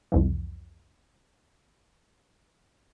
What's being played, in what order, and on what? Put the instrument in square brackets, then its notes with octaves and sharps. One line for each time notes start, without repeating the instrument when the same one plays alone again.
[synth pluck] C2 F2 E3